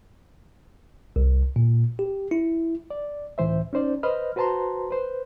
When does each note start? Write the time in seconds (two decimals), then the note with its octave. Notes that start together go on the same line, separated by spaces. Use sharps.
1.16 C2
1.56 A#2
1.99 G4
2.31 E4
2.90 D5
3.38 C#2 A2 E3 C5 E5
3.73 C#4 D#4 C5 D5
4.03 B4 C5 D#5 B5 F6
4.36 F#4 B4 C5 A5 A#5 C6
4.91 B4 C5